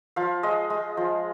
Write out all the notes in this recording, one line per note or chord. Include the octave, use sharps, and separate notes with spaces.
F3 F5
G#3 D#5
G#3
F3